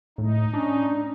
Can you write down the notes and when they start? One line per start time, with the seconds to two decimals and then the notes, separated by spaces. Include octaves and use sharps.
0.18 A2 D#4
0.54 C#4 D4